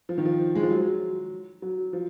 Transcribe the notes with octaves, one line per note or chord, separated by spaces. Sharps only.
F3
D#3
F3
G#3
F3
F#3
F#3
F3